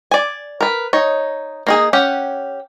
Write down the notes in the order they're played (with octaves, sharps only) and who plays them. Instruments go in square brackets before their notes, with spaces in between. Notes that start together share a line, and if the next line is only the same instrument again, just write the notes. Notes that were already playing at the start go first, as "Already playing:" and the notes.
[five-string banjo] D5 G#5
A#4 B4
D#4 C#5
A#3 D#4 G#4
C#4 G4 F#5